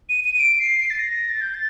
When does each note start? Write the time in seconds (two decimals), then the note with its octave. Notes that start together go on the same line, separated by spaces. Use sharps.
0.09 D#7
0.24 D#7
0.35 D#7
0.39 D7
0.60 C7
0.79 C7
0.90 A6
0.99 A#6
1.29 A6
1.41 G6
1.54 A6